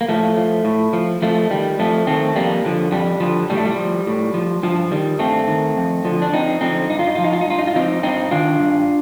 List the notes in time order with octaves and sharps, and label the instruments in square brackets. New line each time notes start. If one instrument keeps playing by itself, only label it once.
[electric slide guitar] A#3
A2 F3 A3
F3
A2
F3
F2 F3 A3
D#3 G3
F2 F3 A3
D#3 A3 C4
F2 G3 A#3
D3 F3
F2 G3
D3 F3
A2 G3
A3
G3
F3
A2
F3
G2 F3
D#3 G3
G2 A3 C4
D#3
F2
D3 F3
D4
F2 C4 D#4
D3 F3 C4 D#4
G2 D#4
F4
D#4
F3 F4
D#4
F4
D#4
G2 F4
D#4
F4
F3 C4 D#4
G2 C4 D#4
D#3 D4 F4
G2